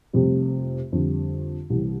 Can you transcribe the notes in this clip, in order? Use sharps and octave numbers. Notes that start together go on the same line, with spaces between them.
F1 F2 C3 G3
F2 D3 G3
C2 C3 E3 G3